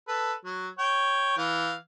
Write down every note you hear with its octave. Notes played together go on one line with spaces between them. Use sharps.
A4 B4
F#3
C#5 G5
E3 F5